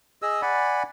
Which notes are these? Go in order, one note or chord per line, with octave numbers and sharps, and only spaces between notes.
G#4 D#5 E6
D5 F#5 G#5 B5